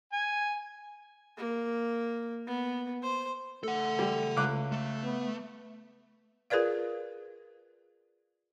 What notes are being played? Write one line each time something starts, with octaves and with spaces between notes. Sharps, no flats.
G#5
A#3
B3
C5
A3 A4 F#5
G3
C#2 D6 F#6
A3
B3
F4 G#4 A#4 B4 D5 F5